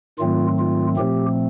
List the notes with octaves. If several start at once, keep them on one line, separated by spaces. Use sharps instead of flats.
G#2 D#3 F#3 A3 C4 F4
F4
A#2 F3 A3 C4 G4